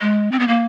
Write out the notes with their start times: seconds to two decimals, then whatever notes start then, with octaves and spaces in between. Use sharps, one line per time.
0.01 G#3
0.32 C4
0.39 B3
0.48 A#3